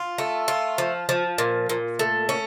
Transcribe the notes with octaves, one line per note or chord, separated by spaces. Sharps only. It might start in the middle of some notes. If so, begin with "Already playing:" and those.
Already playing: F4
A3
F4
F3
F3
A#2
A#2
A3
C#4